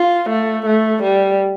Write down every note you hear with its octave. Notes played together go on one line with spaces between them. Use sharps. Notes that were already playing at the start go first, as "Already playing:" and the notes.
Already playing: F4
A3
A3
G3